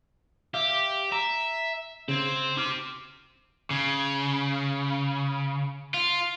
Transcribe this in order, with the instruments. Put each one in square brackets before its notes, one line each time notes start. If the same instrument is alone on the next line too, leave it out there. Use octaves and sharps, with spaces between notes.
[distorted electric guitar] G4 [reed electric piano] E5 F5
[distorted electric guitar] E5 [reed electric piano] A#5
[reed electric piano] C#3 G#6 [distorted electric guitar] C4
[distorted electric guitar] G4 C6 [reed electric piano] D6 F6
[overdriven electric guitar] C#3
F4